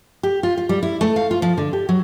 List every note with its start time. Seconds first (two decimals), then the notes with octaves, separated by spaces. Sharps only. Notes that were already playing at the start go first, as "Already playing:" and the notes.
0.23 G4
0.43 F4
0.58 F4
0.69 G3
0.83 E4
1.01 A3
1.16 F5
1.31 F4
1.42 F3
1.58 D3
1.73 G4
1.89 F#3